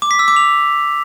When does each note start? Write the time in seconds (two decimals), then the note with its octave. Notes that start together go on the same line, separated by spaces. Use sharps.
0.02 D6
0.11 B6
0.19 E6
0.28 D6
0.36 F7